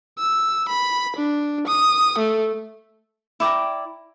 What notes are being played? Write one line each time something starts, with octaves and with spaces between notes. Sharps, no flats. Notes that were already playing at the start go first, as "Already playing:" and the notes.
E6
B5
D4
D#6
A3
E4 D5 G5 A#5